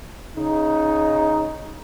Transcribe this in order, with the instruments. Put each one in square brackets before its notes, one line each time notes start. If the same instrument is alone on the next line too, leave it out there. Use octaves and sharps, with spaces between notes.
[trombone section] C#3 D#4